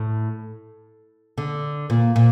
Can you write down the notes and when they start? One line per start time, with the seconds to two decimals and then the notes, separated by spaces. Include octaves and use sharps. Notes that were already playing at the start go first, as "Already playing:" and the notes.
Already playing: A2
1.38 D3
1.90 A#2
2.16 A#2